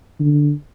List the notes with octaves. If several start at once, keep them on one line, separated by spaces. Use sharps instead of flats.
D3